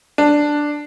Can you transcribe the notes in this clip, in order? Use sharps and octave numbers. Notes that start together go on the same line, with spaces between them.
D4